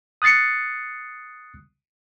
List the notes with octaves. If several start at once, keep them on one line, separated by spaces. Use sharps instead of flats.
D#6 F#6 A6 C7 C#7